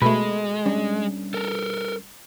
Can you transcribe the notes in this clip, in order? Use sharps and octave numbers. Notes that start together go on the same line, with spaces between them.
B2 G#3 A3 B5
G3 C#4 D4
A4 A#4